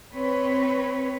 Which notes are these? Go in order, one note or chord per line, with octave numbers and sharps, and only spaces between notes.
C4 B4 C#5